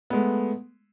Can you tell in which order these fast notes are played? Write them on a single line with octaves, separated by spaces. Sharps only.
B3 G#3 A3